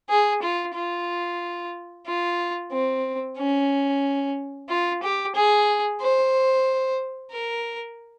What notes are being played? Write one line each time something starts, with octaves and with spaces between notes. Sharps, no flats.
G#4
F4
F4
F4
C4
C#4
F4
G4
G#4
C5
A#4